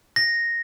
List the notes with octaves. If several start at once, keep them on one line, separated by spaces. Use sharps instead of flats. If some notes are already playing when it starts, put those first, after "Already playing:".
A#6